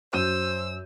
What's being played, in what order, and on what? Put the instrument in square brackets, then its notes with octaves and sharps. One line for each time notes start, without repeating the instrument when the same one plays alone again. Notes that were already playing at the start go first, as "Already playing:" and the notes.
[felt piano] F#2 G6 D#7 [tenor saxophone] C5 [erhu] E6